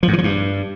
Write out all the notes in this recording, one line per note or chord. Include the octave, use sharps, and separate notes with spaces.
F3
G#2
E3
F3
G2